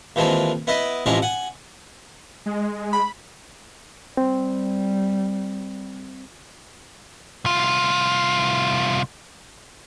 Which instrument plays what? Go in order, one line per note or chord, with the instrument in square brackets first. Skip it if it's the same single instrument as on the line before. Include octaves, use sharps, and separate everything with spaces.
[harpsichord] D#2 E3 F3 G#3 C4
B3 E4 B4 D#5
A1 C3 F3 G#3 E4 A#5
F#5 G#5
[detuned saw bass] G#3
[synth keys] B5
[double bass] G3 [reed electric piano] C4
[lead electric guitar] C2 F4